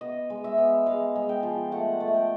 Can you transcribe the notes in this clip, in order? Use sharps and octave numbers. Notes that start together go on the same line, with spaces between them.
B3 D#5
G#3
E5
B3
G#3 F5
G#3
G5
F3
A3 F#5
A3
G5